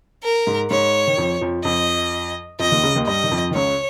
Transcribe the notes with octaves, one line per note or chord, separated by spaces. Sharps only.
A#4
G#2
G#2 C#5
D#3
F2 F3
F2 F3
F2 F3 D#5
F2 F3 D#5
D#2 D#3
C#2 C#3
D#2 D#3
G2 G3 D#5
D#3
F2 F3
D#3
C#2 C#3 C#5